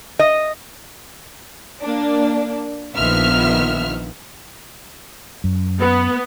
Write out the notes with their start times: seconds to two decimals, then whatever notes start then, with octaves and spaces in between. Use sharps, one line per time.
0.19 D#5
1.81 A#3 D4
2.95 A#1 D#3 F3 B3 E5 F6
5.44 F#2
5.80 B3